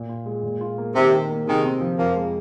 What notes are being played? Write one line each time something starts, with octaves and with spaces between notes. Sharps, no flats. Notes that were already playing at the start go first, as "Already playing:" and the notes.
Already playing: A#2
F4
G#3
A#2
F4
A#3
C3 D#3
D#4
A#3
C3 D#3 G#3
C4
F3
F2 F3 A#3
G#3